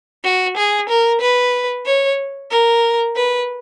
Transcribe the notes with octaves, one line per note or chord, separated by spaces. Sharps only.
F#4
G#4
A#4
B4
C#5
A#4
B4